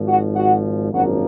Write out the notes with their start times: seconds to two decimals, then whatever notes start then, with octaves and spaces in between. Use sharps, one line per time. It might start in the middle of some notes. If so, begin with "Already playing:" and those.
Already playing: G#1 G#2 F3
0.08 F#4 F#5
0.36 F#4 F#5
0.93 G#1 F#2 F3 A#3 F#4 F#5